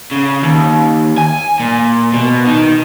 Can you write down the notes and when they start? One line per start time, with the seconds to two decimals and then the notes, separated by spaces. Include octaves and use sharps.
0.11 C#3
0.43 D#2
1.18 G#5
1.60 A#2
2.13 B2
2.47 D#3